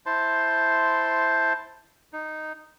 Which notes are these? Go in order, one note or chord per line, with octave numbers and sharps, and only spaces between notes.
E4 C5 A5 C6
D#4